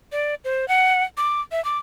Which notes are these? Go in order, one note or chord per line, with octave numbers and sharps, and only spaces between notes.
D5
C5
F#5
D6
E5
D6